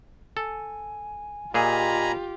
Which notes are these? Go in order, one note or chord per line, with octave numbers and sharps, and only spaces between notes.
A4 G#5
A#2 F4 G4 G#4 D#5 G#5 A#5 B5